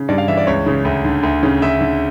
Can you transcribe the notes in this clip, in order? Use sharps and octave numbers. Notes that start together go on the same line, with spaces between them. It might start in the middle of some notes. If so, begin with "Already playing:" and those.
Already playing: C#3
G2 D5
F5
E3 E5
D5
C#2 C#5
C#3
D2
D3
D2
C#3
D2 E5
D3